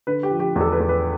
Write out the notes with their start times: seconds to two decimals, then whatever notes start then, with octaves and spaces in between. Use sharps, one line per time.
0.07 D3 B4
0.23 G4
0.31 F3
0.40 G4
0.56 E2
0.61 A4
0.72 B4
0.80 E2
0.89 B4